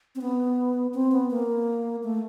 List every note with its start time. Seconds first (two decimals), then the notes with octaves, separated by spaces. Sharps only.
0.15 C4
0.21 B3
0.94 C4
1.12 B3
1.31 A#3
2.03 A3